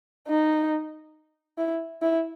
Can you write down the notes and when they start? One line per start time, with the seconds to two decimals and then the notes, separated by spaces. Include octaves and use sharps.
0.28 D#4
1.58 E4
2.02 E4